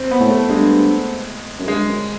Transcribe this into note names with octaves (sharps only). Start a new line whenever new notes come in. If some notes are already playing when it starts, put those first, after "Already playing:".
Already playing: C4
B3
A2
A3
G2 G#3
F#2
G2 G#3
F#2